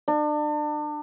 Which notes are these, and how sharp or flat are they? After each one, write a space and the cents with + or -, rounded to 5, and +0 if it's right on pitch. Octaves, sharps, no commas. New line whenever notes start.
D4 +35